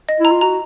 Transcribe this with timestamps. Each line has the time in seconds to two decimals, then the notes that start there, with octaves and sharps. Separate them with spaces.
0.09 D#5
0.20 E4 A#5
0.31 F4
0.41 F#4 A#5